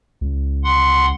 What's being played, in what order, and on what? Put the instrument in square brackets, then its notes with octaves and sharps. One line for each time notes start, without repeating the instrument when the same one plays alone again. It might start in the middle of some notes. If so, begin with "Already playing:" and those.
[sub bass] C#2
[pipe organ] F#5 C6